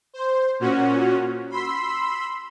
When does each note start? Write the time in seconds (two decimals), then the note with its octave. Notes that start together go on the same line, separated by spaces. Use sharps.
0.13 C5
0.60 A#2 C#4 F#4
1.50 B5 C6 E6 B6